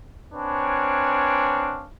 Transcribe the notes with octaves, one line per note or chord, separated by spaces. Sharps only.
C4 D4 B4 C#5 F5 G#5